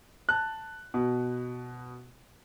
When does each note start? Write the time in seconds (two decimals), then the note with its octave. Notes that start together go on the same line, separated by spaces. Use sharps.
0.29 A5 F#6
0.94 B2